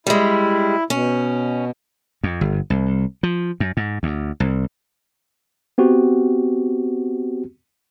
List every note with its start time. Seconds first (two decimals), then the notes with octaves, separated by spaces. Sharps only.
0.07 G3 G#3 E4
0.90 B2 C#4
2.23 F2
2.41 G1
2.70 C2
3.23 F3
3.60 F#2
3.77 G#2
4.03 D2
4.40 C2
5.78 B3 C4 F#4 G4